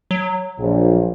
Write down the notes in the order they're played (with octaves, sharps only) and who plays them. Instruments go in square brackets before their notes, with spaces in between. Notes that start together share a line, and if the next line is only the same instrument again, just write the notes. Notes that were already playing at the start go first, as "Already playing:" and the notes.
[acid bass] F#3
[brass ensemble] A#1